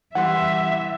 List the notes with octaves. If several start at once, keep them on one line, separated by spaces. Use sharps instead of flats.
E3 G3 E5 F#5 C6